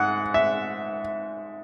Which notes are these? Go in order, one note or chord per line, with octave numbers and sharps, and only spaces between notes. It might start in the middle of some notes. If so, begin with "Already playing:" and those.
Already playing: G#2 F#5
E5